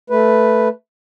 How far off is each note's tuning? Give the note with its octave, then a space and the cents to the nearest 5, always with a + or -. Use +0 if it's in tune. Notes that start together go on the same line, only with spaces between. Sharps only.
A3 +0 B4 +0